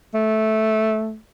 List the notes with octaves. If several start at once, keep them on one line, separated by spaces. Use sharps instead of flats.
A3